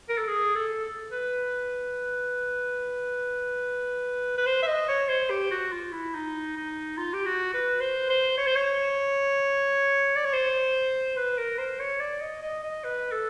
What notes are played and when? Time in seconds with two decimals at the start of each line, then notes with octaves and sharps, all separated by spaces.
0.09 A#4
0.18 A4
0.28 G#4
0.55 A4
1.11 B4
4.37 B4
4.46 C5
4.63 E5
4.67 D#5
4.89 C#5
5.08 C5
5.30 G4
5.51 F#4
5.72 F4
5.92 E4
6.14 D#4
6.56 D#4
6.98 F4
7.13 G4
7.26 F#4
7.54 B4
7.81 C5
8.10 C5
8.38 C#5
8.46 C5
8.55 C#5
10.16 D5
10.25 C#5
10.33 C5
11.16 B4
11.38 A#4
11.58 C5
11.80 C#5
12.00 D5
12.21 D#5
12.42 D#5
12.63 D#5
12.84 B4
13.12 A4